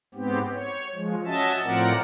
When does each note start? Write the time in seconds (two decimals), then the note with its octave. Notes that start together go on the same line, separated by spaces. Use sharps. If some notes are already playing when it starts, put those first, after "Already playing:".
0.15 G#2 B3 C4 G4
0.54 C#5
0.95 F3 G#3
1.26 C#4 F#4 D#5 E5 A5
1.63 A2 F3 C4 A#4 D5 F#5